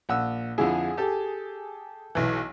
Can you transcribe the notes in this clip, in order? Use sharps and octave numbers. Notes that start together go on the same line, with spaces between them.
A#1 F#5 E6
F2 D3 E4 G#4
G4 A4
B1 E3